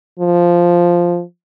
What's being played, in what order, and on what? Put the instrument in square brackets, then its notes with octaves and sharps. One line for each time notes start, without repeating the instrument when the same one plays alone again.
[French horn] F3